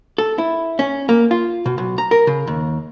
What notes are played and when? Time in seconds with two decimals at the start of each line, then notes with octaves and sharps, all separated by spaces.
0.18 A4
0.38 E4
0.79 C#4
1.09 A#3
1.31 F4
1.66 B2
1.78 B1
1.98 A#5
2.11 A#4
2.27 C#3
2.47 D#2